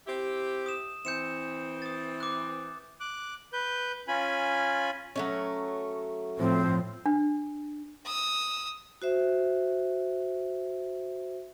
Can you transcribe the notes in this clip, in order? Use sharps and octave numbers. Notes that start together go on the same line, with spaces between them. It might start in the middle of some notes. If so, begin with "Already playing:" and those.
C4 E4 G4
D#6 E7
E3 C4 G6 C#7 E7
D#6 A6
D6 F#6
D6 F#6
B4 G6
C#4 F4 G#5 B5
F#3 A3 C#4
A2 F3 C4
D4
D#6 E6
F#4 C5 E5